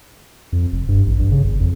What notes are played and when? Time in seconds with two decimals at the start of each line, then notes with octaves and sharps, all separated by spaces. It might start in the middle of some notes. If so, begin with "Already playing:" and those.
0.53 F2
0.72 F1
0.89 G2
1.06 A1
1.19 G2
1.32 C#3
1.44 G1
1.60 F2